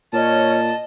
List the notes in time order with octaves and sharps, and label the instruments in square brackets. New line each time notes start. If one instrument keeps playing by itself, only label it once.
[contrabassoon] A#2 [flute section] C#5 F6 [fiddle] D#5 [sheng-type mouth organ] A5